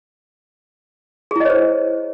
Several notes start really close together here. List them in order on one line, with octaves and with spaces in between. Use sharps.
G#4 E4 D#5 C#5 C5